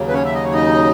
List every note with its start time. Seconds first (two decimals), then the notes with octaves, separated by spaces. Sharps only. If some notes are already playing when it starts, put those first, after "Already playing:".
Already playing: D#2 C#3 F#3
0.08 B4
0.13 C#4 C#5
0.24 E5
0.35 D#5
0.44 C#5
0.53 D#4 D#5